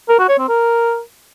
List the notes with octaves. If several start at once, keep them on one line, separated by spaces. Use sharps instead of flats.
A#4
F#4
C#5
C4
A#4